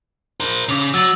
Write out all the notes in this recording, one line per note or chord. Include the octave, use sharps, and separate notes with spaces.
A#4 C5
C#3 D6 F7
F#3 E6 A6 F#7